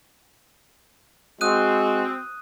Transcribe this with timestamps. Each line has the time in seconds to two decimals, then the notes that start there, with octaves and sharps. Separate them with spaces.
1.41 G#3 C4 F#4 D#6 F#6 D#7